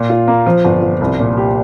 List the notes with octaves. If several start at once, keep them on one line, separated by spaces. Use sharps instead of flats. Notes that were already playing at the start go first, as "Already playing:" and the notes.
Already playing: A#2
F4
A#3
F3
G1
F3
C2
A#2
G4